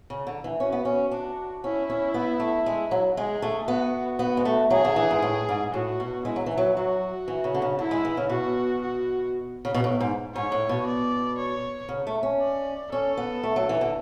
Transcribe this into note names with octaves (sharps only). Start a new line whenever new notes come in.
C#3
D3
E3
C#4 F#4
B3
C#4
D4
C#4 E4
C#4
B3
A3
G#3
F#3
G#3 G#4
A3
B3 F#4
B3
G#3
A3
F#3 G#4
D3
E3
G#2
A2
G#2
A2 F#4
B2
G#3 E4
F#3
E3
F#3
F#3 F#4
E3
C#3
D3
C#3
D3 E4
G#3
E3
C#3
B2 F#4
F#4
C#3
B2
A2
G#2
G#2 C#5
A2
B2
D5
C#5
C#3
A3
C#4
D5
C#4 A4
B3
A3
F#3
E3
D3